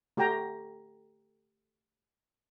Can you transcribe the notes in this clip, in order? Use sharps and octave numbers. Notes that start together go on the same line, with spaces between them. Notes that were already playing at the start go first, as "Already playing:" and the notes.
A3 F#4 G4 G5 A#5